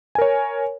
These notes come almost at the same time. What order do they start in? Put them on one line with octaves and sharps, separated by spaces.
G#5 A#4 C#5